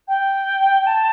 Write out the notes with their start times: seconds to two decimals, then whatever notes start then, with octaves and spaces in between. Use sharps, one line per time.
0.07 G5
0.86 A5